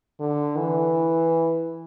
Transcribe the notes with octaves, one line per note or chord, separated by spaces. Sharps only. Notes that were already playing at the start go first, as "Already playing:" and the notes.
D3
E3